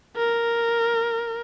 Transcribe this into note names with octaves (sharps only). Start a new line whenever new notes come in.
A#4